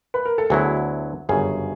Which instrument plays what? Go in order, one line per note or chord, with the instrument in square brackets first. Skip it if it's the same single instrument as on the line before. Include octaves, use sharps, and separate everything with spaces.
[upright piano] B4
A#4
A4
[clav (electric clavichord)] D2 D3 F#3 B3 E4 [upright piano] G#4
[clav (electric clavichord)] G1 F#2 C#3 [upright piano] G#4